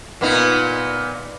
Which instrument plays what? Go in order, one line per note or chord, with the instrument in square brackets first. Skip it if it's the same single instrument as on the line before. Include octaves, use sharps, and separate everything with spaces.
[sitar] A#2 B3 D#4